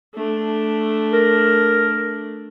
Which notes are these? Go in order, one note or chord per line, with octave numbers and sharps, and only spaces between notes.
A3 D4
A#4